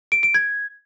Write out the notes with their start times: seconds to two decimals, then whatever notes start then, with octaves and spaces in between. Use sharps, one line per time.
0.12 D7
0.23 D7
0.34 G#6